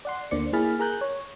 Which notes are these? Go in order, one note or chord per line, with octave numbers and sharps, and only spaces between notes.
D5 F#5 C6
D2 D3 A#3 C5 D5 C#7
A#3 E4 G#4 B5 F6 A6
G#4 A#4 A#5 F#6 G6
C#5